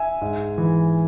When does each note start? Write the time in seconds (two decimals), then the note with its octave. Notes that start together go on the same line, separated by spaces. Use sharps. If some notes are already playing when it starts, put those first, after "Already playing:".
Already playing: E5 G#5
0.21 G#2
0.58 E3